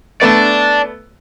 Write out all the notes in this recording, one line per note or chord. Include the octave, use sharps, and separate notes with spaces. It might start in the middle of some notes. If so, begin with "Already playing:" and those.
A3 B3 D5 A5